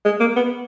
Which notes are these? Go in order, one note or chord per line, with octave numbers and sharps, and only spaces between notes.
G#3
A#3
B3